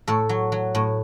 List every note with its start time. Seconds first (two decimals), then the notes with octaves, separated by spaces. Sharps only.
0.08 A2 A4
0.29 F#3
0.52 F#3
0.75 A2